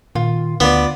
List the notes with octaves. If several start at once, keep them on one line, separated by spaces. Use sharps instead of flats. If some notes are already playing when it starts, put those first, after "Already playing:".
A#2 D#3 F4
D2 D3 B3 F4 D5